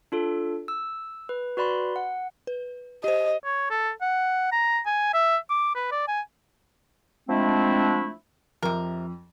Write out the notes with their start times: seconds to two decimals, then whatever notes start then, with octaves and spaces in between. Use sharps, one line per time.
0.12 D4 F4 A4
0.68 E6
1.29 B4
1.57 F#4 B4 D5 B5 C6
1.96 F#5
2.47 B4
3.04 G4 C5 D#5
3.44 C#5
3.71 A4
4.02 F#5
4.52 A#5
4.86 G#5
5.14 E5
5.50 D6
5.75 B4
5.92 D5
6.08 G#5
7.28 F3 G#3 A3 C4 D4 E4
8.63 F2 C3 A#4